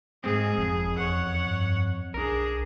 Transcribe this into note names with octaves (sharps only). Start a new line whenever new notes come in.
G#2 G#3 C4 G#4
F#1 F2
E2 C#5 F#5
G2
B1 D4 G#4 A#4